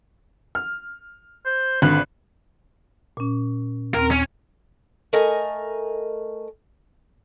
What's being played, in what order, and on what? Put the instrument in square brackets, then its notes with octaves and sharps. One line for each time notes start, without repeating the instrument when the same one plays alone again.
[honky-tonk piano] F6
[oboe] C5
[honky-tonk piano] G#1 D3 F#7 [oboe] B4
[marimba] A#2 C#4
[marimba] D#2 C4 [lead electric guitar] A#4
[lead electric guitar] C#4
[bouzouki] A3 A#4 D#5 G#5